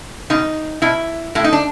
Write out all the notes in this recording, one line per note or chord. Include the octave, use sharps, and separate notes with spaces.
B2 D#4
B2 E4
A2 E4
D#4
D4